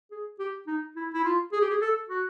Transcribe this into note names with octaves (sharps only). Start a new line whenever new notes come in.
G#4
G4
D#4
E4
E4
F4
G#4
G4
G#4
A4
F#4